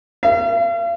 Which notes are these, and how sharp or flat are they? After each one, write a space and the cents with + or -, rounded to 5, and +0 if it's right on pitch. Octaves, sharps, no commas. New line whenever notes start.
F5 -40